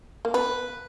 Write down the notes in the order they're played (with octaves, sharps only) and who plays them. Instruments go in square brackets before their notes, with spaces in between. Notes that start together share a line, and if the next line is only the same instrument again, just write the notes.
[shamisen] A#3
[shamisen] B3 [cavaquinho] B4